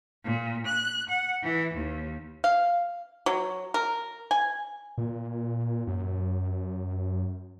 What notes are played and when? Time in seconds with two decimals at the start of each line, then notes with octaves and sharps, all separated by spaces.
0.25 A#2
0.66 F#6
1.09 F#5
1.42 E3
1.75 D#2
2.44 F5
3.26 F#3
3.74 A#4
4.31 G#5
4.98 A#2
5.87 F#2